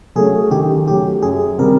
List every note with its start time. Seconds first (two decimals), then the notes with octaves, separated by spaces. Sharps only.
0.15 F#3 A3 C#4 G#4
0.51 D#3 G4
0.87 F#3 A3 C#4 G4
1.22 F#2 G#4
1.58 D#3 G3 C4 A#4